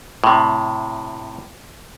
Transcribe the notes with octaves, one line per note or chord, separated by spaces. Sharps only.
A2 C3